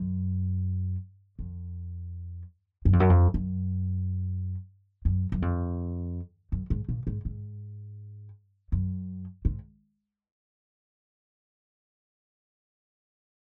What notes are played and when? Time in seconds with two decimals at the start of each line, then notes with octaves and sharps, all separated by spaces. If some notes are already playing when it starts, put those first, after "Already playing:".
Already playing: F#2
1.39 F2
2.85 F#2
2.93 F2
3.00 F#2
3.10 F2
3.34 F#2
5.05 F#2
5.32 F#2
5.42 F2
6.52 F#2
6.70 G#2
6.89 A#2
7.07 G#2
7.25 G#2
8.72 F#2
9.45 G#2